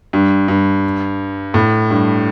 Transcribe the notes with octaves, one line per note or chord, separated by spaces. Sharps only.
G2
G2
A2
G2